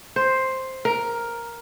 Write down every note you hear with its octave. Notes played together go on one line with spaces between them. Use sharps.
C5
A#4